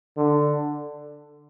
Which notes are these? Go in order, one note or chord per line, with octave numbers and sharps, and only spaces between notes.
D3